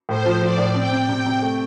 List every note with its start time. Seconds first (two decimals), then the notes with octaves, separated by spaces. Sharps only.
0.09 A2 C5
0.26 F3
0.41 F3 D5
0.58 A2
0.75 C4 G5
0.92 C3
1.08 C3 G5
1.26 C3
1.42 A3